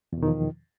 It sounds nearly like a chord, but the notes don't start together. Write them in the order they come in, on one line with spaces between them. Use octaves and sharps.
E2 B2 D#3 F3